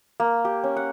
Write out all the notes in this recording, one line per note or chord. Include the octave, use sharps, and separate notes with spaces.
A#3
G4
C#4
F#5